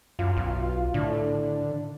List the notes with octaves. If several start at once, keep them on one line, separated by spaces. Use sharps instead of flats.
F#2 F4
B1
A2 D3